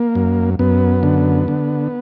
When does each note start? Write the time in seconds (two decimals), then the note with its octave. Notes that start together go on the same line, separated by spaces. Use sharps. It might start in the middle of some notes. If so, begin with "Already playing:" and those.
Already playing: A#3
0.15 F#2
0.59 F#2 B3
1.03 D3
1.48 D3